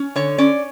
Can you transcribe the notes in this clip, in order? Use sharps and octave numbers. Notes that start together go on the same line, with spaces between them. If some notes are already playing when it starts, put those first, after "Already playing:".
Already playing: C#4
D3 C#5
C#4 D5